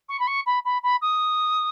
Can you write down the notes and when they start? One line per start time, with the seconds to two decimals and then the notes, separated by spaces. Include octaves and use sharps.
0.09 C#6
0.20 B5
0.27 C#6
0.46 B5
0.65 B5
0.83 B5
1.02 D#6